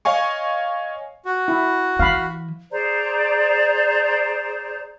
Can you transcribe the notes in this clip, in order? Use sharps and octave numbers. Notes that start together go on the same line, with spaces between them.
C#5 D#5 F5 G#5 C#6
F#4
E4
E3 F5 B5
G#4 C5 D5 A#5